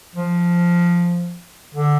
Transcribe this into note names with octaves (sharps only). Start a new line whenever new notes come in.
F3
D3